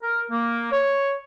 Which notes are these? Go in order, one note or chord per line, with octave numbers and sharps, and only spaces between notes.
A#4
A#3
C#5